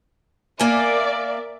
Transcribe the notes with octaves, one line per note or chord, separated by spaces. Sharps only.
A#3 A#4 D5 E5 G#5